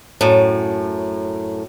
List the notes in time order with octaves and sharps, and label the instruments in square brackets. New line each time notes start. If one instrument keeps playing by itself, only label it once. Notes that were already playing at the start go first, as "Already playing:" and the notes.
[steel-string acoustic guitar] F#2 A2